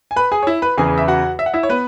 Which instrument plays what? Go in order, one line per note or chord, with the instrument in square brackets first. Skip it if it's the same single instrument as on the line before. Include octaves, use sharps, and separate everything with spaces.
[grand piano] G#5
B4 B5
G#4 G#5
C#5
E4 E5
B4 B5
E2 C#3 E3 G#4 G#5
E5
F#4 F#5
E5
F#5
E4 E5
C#5
B3 B4